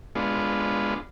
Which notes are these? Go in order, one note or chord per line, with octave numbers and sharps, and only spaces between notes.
G#3 B3 D4 F4